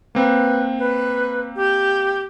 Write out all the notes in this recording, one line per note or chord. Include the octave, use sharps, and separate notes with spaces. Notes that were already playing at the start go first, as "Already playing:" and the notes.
A#3 C4 B4
B4
G4